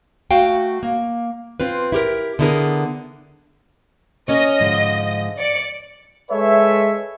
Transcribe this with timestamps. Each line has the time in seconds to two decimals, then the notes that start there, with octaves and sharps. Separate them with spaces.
0.31 A3 F#4 F5 G5
0.83 A#3
1.60 C4 F4 B4
1.92 E4 G4 A#4
2.39 D3 B3 E4 G#4 A#4
4.28 A#3 C#4 C#5 D#5
4.60 G#2 D3 F3
5.37 D5 C#7
6.31 G#3 A4 B4 C#5 E5